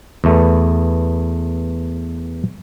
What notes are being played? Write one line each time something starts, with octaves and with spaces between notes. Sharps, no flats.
E2 A3 B3